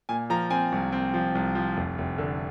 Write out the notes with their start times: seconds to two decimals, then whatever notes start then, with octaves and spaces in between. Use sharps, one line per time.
0.09 A#2 G#5
0.30 F3 A#5
0.51 C4 G#5
0.72 C2
0.92 C4
1.14 F3
1.35 C2
1.55 F3
1.77 F1
1.98 F1
2.18 D3